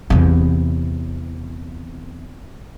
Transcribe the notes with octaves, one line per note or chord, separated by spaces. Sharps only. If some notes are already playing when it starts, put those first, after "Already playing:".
E2 C3